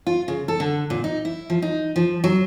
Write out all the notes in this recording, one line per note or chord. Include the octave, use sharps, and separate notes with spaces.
F4
C#3
A4
D3
A#2
D#4
E4
F3
D#4
F3
F#3